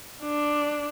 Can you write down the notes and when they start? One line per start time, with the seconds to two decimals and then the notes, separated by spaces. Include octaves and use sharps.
0.23 D4